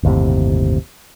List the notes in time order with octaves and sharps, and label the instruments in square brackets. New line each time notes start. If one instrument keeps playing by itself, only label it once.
[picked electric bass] G1 D#2 A2 C3